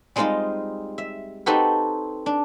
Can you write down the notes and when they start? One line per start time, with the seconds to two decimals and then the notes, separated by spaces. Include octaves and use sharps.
0.16 G3 G#3 C4 D#4 F4 D#5
0.98 E5
1.46 C4 D#4 F#4 G4 A4 B4
2.26 D4